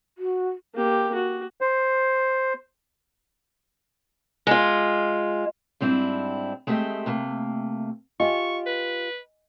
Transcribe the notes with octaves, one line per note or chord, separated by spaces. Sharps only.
F#4
A#3 G4
F#4
C5
G#3 F4
G#2 G3 C4 D4 E4
G#3 A3 C4 G4 D#5 E5
C3 A3 A#3
F4 G4 D#5 G5 G#5 C#6
B4